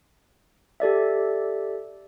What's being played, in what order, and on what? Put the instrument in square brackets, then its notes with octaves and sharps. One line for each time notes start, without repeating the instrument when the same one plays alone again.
[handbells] G4 A4 D5 E5